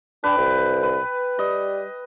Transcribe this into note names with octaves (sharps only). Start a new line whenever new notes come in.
D4 B4 G5
C2
B4
G3 D#5